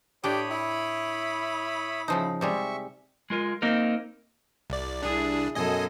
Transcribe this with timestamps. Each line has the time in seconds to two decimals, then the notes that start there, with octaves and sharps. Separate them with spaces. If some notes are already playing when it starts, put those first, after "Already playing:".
0.24 A2 D4 G4 C#5 G5 B5 D#6
0.51 E4
2.08 C#3 F3 D#4
2.41 C3 G3 G#3 E5 C#6
3.30 G#3 F4 A#4
3.62 A#3 C4 D#4 A#4
4.70 C2 D5
5.02 C2 D4 E4 G#4
5.55 F#2 B2 A4 D#5 G#5